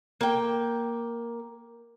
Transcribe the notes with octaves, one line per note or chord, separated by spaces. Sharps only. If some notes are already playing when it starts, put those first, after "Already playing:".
A#3 G5